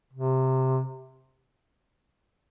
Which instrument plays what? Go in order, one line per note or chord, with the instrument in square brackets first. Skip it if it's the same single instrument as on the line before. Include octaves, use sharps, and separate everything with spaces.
[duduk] C3